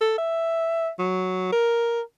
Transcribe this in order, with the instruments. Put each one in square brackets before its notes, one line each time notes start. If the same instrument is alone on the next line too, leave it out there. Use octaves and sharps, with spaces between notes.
[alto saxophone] A4
E5
F#3
A#4